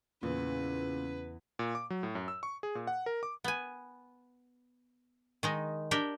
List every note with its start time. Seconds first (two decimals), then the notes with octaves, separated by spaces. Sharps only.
0.23 E2 A#2 C#3 B4
1.59 A#2
1.75 D6
1.90 F#3
2.03 A2
2.15 F#2
2.28 E6
2.43 C#6
2.63 G#4
2.75 A#2
2.87 F#5
3.06 A#4
3.23 D6
3.44 B3 G#5
5.43 D#3 G#3 D#4
5.91 D4 G4 A#4 G5